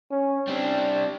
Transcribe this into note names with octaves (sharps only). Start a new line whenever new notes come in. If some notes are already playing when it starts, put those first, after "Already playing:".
C#4
G3 C4 D4